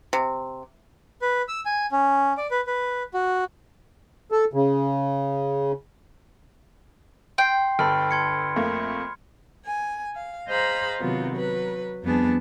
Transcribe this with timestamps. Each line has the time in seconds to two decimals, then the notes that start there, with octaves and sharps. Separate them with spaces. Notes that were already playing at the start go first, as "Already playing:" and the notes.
0.13 C3
1.22 B4
1.48 E6
1.66 G#5
1.92 C#4
2.37 D5
2.51 B4
2.67 B4
3.14 F#4
4.32 A4
4.53 C#3
7.38 G5 C6 C7
7.79 G1 A4 B5 F6
8.11 C6 G#6 C#7
8.56 F2 A3 A#3
9.66 G#5
10.16 F5
10.48 G#4 C5 D#5 F5 A#5 B5
11.00 C3 D#3 F#3 B3 F4
11.31 F#3 B4
12.03 F2 G3 B3 D4 G#4 A5